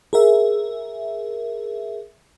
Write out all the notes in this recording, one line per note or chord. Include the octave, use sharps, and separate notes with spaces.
G#4 A#4 E5